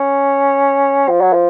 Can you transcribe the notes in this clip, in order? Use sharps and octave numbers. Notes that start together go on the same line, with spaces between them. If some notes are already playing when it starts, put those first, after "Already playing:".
Already playing: C#4
F3
F#3
F3